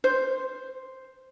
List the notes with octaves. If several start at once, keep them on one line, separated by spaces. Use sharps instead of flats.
C5